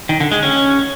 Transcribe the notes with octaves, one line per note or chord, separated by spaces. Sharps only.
D#3
D3
G#3
C#4